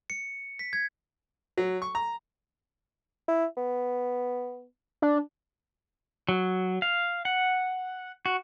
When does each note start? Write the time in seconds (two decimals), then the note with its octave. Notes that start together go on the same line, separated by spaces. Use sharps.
0.10 C#7
0.59 B6
0.73 G#6
1.58 F#3
1.82 C#6
1.95 A#5
3.28 E4
3.57 B3
5.02 D4
6.29 F#3
6.82 F5
7.25 F#5
8.26 F#4